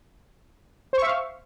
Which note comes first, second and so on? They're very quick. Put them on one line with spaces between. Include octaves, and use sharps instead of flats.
C5 C#6 E5 F5